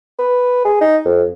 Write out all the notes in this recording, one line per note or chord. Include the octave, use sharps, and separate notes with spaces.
B4
G#4
D#4
F2